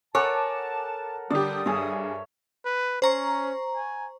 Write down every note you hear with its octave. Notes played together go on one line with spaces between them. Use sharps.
A4 A#4 C#5 F#5 G#5 A5 D6
D3 G3 G4 D5 D#6
G2 G#4 C#5 E5 G#5
B4
C#4 C5 A#5 C#6
G#5